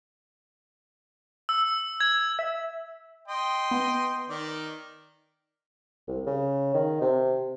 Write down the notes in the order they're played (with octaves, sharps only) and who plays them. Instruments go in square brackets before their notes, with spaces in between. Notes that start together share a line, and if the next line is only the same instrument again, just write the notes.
[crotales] E6
G#6
[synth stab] E5
[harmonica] D#5 G5 C6
[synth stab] B3
[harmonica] D#3 D5
[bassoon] C2
C#3
D#3
C3